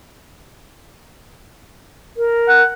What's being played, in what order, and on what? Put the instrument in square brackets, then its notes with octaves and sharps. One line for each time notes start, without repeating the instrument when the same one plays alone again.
[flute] A#4
[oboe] F#5